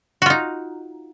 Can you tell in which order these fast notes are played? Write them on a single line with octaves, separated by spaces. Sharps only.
F#4 F4 D#4